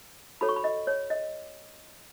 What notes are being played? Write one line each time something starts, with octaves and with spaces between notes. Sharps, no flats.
F#4 A4 C#5 B5
C#6
B5
D#5
C#5
D#5